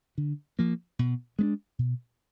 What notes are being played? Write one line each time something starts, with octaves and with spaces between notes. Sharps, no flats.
D3
F3 A#3
B2
G#3 B3 D4
B2